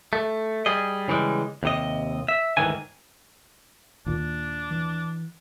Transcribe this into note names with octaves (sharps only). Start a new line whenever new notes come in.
A3
G3 G#4 D#5
C#3 E3 G3 G#3
D#2 C3 D#5
E5
D2 G#2 D#3 E3 G#5
D#2 A#2 D4
E3